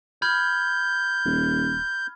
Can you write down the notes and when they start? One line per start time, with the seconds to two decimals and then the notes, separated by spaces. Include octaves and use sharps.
0.22 B5 F6 G6 G#6
1.25 D#1